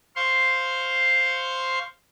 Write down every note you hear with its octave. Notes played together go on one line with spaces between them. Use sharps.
C5 F5 C6 C#6